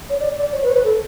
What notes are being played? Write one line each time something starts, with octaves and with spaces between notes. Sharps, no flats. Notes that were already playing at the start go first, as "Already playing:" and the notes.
C#5
D5
D5
C#5
B4
C#5
B4
A4